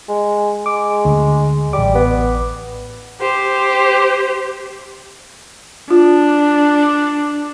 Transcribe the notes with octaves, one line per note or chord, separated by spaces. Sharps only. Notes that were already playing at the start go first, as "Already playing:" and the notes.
G#3
G#3 D6
D2
A1 G3 D6
B3
G4 C5
D4 F4